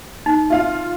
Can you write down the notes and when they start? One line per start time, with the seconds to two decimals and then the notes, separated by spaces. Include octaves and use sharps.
0.26 D#4
0.50 F4 F5